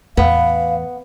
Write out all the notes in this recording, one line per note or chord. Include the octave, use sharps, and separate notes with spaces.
E2 A2 B3 F5